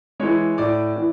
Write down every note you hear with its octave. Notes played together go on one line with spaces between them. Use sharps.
E3 G#3 C#5
A2 D5
E3